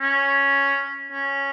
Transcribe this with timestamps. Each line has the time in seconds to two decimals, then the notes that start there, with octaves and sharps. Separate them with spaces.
0.01 C#4
1.12 C#4